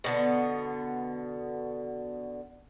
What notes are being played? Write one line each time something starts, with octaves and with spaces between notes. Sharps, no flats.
B2 D3 B3